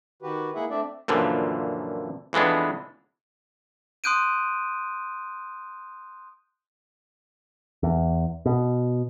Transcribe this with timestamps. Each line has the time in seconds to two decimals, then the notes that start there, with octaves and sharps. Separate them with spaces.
0.22 D#3 F#4 G4 B4
0.55 G#3 A#3 E4 G#4 E5 F#5
0.70 A3 C4 D4 D5 E5
1.08 F#2 A#2 D3 E3 F3
2.33 F2 E3 G#3 B3 D4
4.04 C6 D#6 F#6 G6 D7 D#7
7.83 E2
8.46 B2